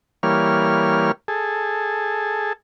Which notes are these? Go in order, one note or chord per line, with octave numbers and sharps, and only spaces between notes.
E3 G3 A#3 C#5 F6
G#4 A4